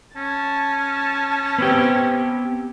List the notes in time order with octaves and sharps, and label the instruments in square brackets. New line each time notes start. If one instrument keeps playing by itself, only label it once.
[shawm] C#4 [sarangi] A5
[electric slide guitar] B3 C4 G4